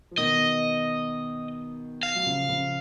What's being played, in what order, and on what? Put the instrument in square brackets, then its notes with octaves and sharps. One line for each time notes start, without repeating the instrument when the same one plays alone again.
[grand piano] F3
[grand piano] B2 D#3 [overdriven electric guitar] D#5
[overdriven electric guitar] F5
[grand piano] F#3
C#3 F3
C#3 F3